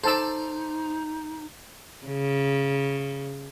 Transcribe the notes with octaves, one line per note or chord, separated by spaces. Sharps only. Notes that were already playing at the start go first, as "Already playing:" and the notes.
D#4 A4 C5 D5 A5 E6
C#3